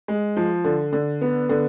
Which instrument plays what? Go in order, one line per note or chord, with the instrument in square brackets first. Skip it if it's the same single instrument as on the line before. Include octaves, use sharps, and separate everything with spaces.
[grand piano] G#3
F3
D3
D3
B3
D3